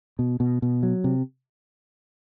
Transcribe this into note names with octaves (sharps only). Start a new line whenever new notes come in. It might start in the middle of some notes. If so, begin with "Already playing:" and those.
B2
B2
B2
F#3
C3